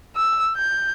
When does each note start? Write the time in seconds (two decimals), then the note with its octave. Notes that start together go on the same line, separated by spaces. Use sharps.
0.17 E6
0.57 G6